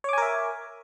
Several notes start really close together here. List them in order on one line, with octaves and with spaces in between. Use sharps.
C#5 D6 G#5 A#4 E5